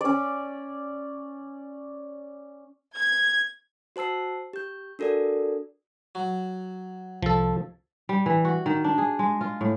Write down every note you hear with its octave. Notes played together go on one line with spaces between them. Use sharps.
C#4 D5
G#6
F#4 C5 A5 E6 C7
G4 G6
D4 F#4 A4 A#4 D5
F#3
C2 F3 A4
G3
E3
F#4
D#3
D4
G#4
G#3
F4
A2